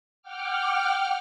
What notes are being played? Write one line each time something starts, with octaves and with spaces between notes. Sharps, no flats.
F#5 G5 D6 F6